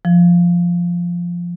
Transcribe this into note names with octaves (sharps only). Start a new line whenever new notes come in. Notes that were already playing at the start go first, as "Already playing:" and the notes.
F3